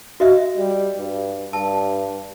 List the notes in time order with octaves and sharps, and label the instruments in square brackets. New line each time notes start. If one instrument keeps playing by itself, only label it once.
[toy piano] F#4 D#5 E5
[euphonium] G3
G2
[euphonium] G2 [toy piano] A5